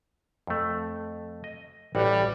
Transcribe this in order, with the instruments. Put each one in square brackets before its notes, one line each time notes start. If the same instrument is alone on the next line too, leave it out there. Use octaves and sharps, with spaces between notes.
[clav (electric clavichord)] F2 A3
D#5
[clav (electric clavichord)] A1 F#4 F#5 [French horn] G3